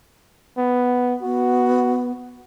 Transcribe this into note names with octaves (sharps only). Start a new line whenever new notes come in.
B3
B3 F#4